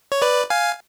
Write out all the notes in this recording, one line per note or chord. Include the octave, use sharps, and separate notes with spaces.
C#5
B4 D5
F5 G#5